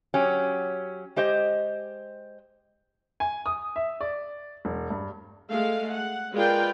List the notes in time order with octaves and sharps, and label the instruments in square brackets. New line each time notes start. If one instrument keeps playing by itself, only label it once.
[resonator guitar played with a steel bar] F#3 C#4 G4
G#3 G4 C5 D#5
[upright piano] G#5
D#6
E5
D5
E1
G2
[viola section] G#3 A3 F5
F#5
G#3 F4 A#4 B4 D5 G5